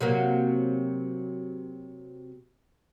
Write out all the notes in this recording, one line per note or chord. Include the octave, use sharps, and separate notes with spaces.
C3 F#3 A#3